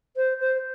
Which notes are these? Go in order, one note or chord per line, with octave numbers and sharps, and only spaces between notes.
C5
C5